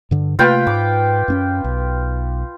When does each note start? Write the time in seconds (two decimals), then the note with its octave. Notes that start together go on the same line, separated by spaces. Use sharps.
0.11 G2 D3
0.39 C3 A3 A#3 F4 B4 G5
0.67 G#2 D6
1.28 F#2 C4 C#4
1.64 B1